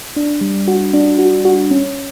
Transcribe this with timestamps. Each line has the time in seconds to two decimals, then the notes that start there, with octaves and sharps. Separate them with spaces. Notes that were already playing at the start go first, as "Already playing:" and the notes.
0.16 D4
0.41 G3
0.68 F#4
0.94 D4
1.19 F#4
1.45 F#4
1.71 C#4